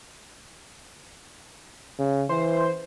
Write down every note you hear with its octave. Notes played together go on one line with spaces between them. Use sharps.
C#3
E3 C5